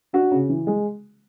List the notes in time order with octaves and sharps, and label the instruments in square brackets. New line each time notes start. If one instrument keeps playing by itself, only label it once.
[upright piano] D4 F#4
C#3
E3
G#3